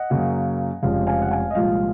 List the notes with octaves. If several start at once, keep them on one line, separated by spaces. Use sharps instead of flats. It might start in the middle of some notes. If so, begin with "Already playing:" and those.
Already playing: D#5 F#5
F#2 C#3 F#3 A#3
F1 F2 C#3 G#3 F5
F5 G#5
F#5
F5 G#5
D#5
C2 A#2 F3 G#3 F5